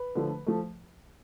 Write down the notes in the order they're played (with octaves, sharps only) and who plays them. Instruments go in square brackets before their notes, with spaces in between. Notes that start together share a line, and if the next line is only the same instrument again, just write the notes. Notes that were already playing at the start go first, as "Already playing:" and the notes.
Already playing: [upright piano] B4
D3 F3 A3
F3 A3